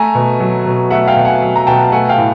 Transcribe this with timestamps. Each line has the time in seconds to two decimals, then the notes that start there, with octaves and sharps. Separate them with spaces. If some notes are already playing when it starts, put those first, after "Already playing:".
Already playing: A3 G#5 A#5
0.15 B2
0.40 F#3
0.66 B2
0.90 A3 E5 F#5
1.08 F5 G5
1.16 B2
1.25 F#5 G#5
1.42 F#3
1.56 A#5
1.67 B2 G5 A5
1.92 A3 F#5 G#5
2.09 F5 G5
2.18 A2